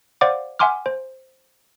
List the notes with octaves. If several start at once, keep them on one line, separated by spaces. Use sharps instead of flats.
C5 D5 F5 F#5 D6
E5 F#5 G#5 C6 D6 F6
C5